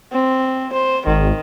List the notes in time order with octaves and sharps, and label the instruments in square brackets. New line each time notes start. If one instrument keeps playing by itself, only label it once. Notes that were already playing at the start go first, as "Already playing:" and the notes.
[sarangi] C4
C5
[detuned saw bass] G#1 [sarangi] D#3